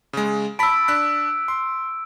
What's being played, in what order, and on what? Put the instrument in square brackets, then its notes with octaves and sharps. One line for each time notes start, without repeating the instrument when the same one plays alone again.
[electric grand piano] C#3 G#3
[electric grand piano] A5 B5 B6 [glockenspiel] E6 D7
[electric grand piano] D4 F#6 B6
C6